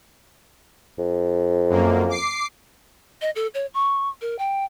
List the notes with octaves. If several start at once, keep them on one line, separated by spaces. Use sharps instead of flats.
F2
F#2 A#3
D6 C7
D#5
A4
C#5
C#6
A#4
G5